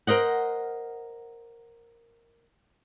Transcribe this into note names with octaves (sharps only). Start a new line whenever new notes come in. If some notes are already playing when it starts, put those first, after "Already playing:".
A#4 C5 D#5 F#5